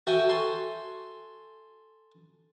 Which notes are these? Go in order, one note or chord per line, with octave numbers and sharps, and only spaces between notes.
F#4 A4 E5 G5 G#5
A4 G#5 C6